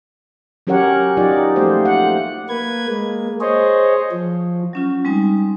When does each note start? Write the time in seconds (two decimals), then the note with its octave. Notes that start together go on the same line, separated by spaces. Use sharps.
0.67 F#3 C#4 G4 A#4 C#5 F#5
1.17 F#3 D#4 F4 G4 D5
1.56 F3 A3 A#3 G4 C5
1.85 F#5
2.49 A#3 B4 G#6
2.88 G#3 A#3
3.41 G#4 C5 C#5 D#5
4.12 F3
4.73 F#3 C#4 F4
5.05 G3 G#3 C4 D#4 G#5